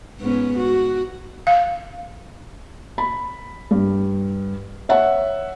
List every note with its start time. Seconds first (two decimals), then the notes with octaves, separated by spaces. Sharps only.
0.20 G#2 B3 C#4
0.57 F#4
1.47 F5
2.98 B5
3.71 G2
4.89 C#5 E5 F#5